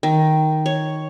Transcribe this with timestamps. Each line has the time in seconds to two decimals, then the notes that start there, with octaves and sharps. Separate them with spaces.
0.03 D#3
0.66 C#5